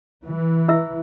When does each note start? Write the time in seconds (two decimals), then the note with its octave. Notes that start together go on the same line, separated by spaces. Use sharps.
0.24 E3
0.68 E4 E5 E6